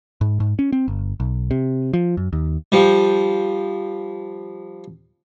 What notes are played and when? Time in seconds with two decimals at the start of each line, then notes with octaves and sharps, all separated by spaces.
0.21 G#2
0.40 G#2
0.59 C#4
0.73 C4
0.88 G1
1.20 B1
1.51 C3
1.93 F3
2.17 F#2
2.33 D#2
2.72 F3 G3